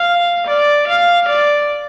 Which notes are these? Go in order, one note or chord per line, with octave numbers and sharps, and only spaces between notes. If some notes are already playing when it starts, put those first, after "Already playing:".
Already playing: F5
D5
F5
D5